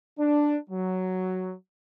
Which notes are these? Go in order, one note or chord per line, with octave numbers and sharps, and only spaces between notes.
D4
F#3